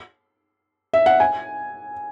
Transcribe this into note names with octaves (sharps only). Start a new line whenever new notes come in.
E5
F#5
G#5